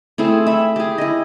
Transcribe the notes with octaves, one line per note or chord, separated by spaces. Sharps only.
A3 C4 E4 G#4
E5 B5
G4 G#4
E4 D#5